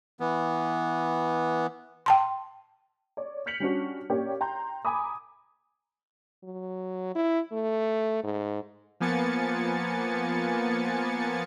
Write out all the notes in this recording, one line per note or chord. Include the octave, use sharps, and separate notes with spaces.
E3 B3
G5 A5 C6
C#5 D5
F6 G6 B6 C#7 F7 F#7
G3 C#4 D4 F#4
A#3 C#4 G4 C#5 D5
G5 A#5 C6 G6
G#5 A#5 B5 D6 D#6
F#3
E4
A3
G#2
F3 A#3 B3 G#5 A6 C#7